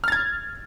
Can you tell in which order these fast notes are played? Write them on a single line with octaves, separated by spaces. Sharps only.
F6 A6 G#6